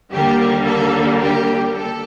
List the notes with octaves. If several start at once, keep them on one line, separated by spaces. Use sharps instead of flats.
D#2 D3 G3 A#3 G4
A4
G4
A4